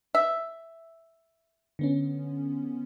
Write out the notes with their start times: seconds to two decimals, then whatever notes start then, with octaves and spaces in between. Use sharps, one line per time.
0.15 E5
1.79 D3 B3 C#4